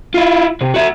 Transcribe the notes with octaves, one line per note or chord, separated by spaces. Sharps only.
E4 F4
C3
F#4 E5